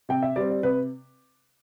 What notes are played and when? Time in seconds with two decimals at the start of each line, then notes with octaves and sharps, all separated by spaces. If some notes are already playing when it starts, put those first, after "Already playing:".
0.09 C3 G5
0.22 E5
0.36 G3 C4 D5
0.50 D5
0.63 C3 B4